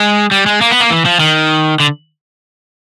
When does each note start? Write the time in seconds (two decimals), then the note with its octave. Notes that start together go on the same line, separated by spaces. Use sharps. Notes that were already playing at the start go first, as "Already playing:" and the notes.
Already playing: G#3
0.31 G3
0.46 G#3
0.61 A#3
0.71 B3
0.80 A#3
0.90 E3
1.05 F3
1.20 D#3
1.80 D3